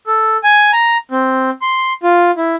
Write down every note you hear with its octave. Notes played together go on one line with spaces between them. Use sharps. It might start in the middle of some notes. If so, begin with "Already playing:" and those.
A4
G#5
A#5
C4
C6
F4
E4